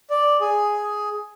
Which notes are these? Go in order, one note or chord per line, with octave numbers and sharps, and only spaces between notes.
D5
G#4